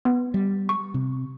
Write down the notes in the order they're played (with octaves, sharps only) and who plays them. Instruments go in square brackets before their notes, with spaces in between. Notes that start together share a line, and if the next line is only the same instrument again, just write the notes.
[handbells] B3
[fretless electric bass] G3
[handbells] C#6
[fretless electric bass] C3